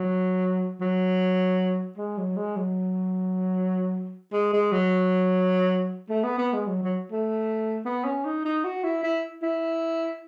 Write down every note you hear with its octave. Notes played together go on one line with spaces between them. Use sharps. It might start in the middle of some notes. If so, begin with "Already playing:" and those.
Already playing: F#3
F#3
G#3
F#3
G#3
F#3
G#3
G#3
F#3
A3
B3
B3
G#3
F#3
F#3
A3
B3
C#4
D#4
D#4
F#4
E4
E4
E4